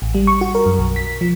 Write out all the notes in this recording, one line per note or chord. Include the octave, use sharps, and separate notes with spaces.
A1
G3
C#6
F#4
A#4
F#2
B1
B6
F3